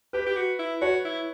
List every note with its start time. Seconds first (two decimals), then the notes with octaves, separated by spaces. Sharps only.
0.13 G4 B4
0.26 G4
0.36 F#4
0.59 E4
0.81 F#4 C#5
1.05 E4